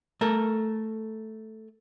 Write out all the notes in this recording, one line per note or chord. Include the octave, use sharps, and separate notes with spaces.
A3 A4 A#4